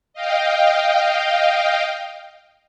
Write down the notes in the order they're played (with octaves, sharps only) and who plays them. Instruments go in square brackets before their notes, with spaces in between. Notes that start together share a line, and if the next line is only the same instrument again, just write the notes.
[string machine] D#5 F5 G5